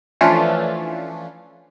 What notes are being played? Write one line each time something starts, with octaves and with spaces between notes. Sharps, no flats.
E3 F3 A3 C#4 D4 F4